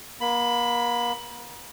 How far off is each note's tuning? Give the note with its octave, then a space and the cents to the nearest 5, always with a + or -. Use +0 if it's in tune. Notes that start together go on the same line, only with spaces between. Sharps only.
A#3 +40 B5 +15